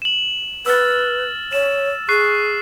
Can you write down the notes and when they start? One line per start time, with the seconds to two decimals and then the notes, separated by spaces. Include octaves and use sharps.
0.02 E7 F#7
0.66 B4 E6 F6 A6
1.53 C#5 E7
2.09 G#4 C#6 F#6 C7